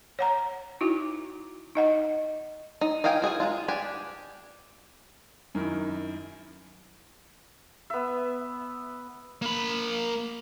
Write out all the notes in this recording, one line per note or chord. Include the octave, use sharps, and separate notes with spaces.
C#5 F#5 A#5
D#4 E4 F#4
D#4 D#5 F#5
D#4
D#4 D#5 F5 G5 G#5
F#4 G#4 G5 G#5
G#3 D#4 F4
D4 G4 G#5
F#2 D#3 E4
B3 E5
A#3 B5